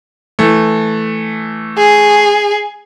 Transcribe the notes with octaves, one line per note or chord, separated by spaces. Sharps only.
E3 A3
G#4